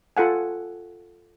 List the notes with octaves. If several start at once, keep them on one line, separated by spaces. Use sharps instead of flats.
F4 A4 F#5 G#5